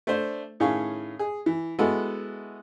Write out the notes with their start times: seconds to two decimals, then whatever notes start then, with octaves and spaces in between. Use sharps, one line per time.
0.07 A3 D4 C5
0.60 A2 D#3 C#4 G#4 F5 C#6
1.19 G#4
1.46 E3
1.79 G#3 B3 E4 F#4 A4